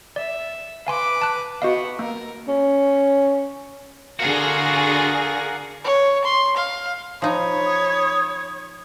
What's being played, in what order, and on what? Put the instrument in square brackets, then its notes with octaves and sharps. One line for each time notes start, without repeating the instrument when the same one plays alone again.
[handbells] D5 [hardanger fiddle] E5
[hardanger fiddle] B4 D6 [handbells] F5 G#5 C6
[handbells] A5 F#6
[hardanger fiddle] B3 F#5 [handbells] F#4 D#5 F5
[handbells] A#3 [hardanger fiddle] A#4
[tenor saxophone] C#4
[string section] D3 G#4 A#6 [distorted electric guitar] F4 F#4 [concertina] A#4 F5 F#5
[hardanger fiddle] C#5
C6
F5
[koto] F3 D#4 [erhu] C#5 [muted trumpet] B5
[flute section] D#6 G#6